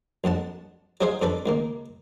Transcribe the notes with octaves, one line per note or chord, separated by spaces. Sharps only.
A#1 F2 F#5 A5
F#3 D#4 G#4 C5 C#5 F5
F2 D4 A4 B4 B5
C#2 D#3 A#3